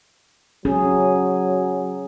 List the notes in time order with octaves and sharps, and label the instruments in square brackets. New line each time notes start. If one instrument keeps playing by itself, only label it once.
[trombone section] F#3 [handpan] C#4 G#4